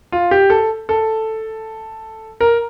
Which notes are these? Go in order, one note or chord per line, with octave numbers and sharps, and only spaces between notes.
F4
G4
A4
A4
A#4